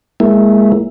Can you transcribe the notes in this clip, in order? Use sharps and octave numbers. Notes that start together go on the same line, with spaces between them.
G#3 A#3 E4